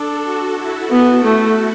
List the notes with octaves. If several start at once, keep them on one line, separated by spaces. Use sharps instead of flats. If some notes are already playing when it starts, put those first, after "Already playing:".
Already playing: D4 A4
F#4
E4
B3
A3